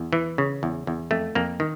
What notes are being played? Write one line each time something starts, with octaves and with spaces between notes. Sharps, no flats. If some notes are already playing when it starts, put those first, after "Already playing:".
Already playing: E2
E3
C#3
E2
E2
F2 A3
F2 A#3
D#3